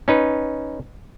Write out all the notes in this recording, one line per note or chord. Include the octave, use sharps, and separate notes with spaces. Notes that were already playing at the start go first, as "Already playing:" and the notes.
C#4 D#4 B4